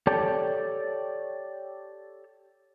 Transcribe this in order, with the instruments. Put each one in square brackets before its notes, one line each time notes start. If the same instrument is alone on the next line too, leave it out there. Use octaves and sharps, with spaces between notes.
[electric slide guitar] G4 A4 C#5 D5 G5 A5